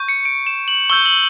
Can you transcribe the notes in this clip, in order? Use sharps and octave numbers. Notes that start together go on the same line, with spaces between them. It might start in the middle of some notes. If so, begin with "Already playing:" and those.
Already playing: C#6 G6
C#7
D7
E7
F#7
C#6 E6 G6 G7
F#7